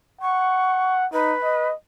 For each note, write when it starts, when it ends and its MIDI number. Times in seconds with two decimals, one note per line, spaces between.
0.21 1.07 78
0.21 0.95 85
1.13 1.34 63
1.13 1.68 71
1.44 1.74 75